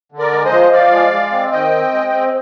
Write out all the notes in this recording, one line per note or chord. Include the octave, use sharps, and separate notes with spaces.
D3
A#4 D5
G#3
C5 D#5
F3
F3 D5 F5
G#3
G#3
C4
D#3 D#5 G5
C4
G#3
C4